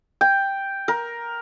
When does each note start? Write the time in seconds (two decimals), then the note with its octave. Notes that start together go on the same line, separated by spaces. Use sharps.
0.21 G5
0.88 A#4